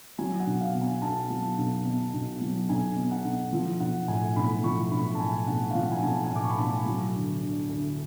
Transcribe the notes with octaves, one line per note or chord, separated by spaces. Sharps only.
F#3 G#5
F#5
B1
F5
B2
G#5
B1 A5
F#3
B1
B2
B1
F#3
B1 G#5
B2
F#5
B1
F3
B1 F#5
A2 G#5
B1 B5
F3 C#6
B1 B5
A5
A2 G#5
B1 F#5
F5
F3 F#5
G#5
B1 A5
G#5
A2 D6
C#6
B5
B1 A5
G#5
F#3
D2
D3
D2